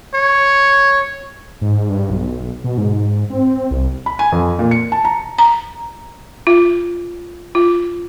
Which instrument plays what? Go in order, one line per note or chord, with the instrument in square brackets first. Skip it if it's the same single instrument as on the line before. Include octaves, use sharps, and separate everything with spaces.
[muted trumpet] C#5
[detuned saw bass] G#2
G2
B1
B2
G#2
C4
C2
[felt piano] B5
G#5
F2
A#2
C#7
A5
A#5
[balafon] A#5
F4
F4